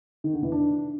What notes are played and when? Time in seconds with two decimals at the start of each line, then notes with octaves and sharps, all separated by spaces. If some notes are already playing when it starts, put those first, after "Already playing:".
0.24 D#3
0.33 D3
0.43 E3
0.52 D4